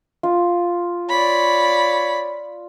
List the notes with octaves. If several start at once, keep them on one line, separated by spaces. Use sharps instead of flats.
F4
C#5 D5 B5